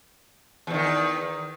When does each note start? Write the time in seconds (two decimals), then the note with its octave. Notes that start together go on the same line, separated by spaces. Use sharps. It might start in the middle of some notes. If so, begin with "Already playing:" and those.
0.67 E2
0.70 B2
0.74 D#3